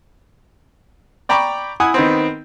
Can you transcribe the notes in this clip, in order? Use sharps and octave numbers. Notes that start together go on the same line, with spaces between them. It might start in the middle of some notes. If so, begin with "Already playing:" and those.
D5 G5 A#5 B5 C#6 D6
E4 F#5 G#5 D#6
D#3 B3 C4